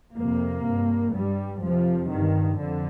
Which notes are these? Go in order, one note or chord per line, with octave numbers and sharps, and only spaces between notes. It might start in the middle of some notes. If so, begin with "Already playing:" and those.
F2 C3 A#3
G2
G2 G3
F2 C3 F3
G2 D#3
F2 D3